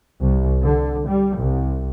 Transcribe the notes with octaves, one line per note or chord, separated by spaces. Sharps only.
C2
D3
G3
C2